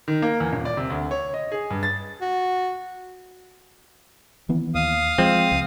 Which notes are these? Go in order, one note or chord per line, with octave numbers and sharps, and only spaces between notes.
D#3
A#3
E2
D#1
D5
C3
D2
C#5
D#5
G#4
G2
A6
F#4
D#3 E3 B3
D#2 F5 D#6
F3 G#3 C4
C#2